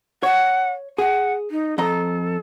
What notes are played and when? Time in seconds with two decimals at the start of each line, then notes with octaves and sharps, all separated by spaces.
0.23 C#5 F#5
0.98 G#4 F#5
1.50 D#4
1.78 F2 A4 D#5 A#5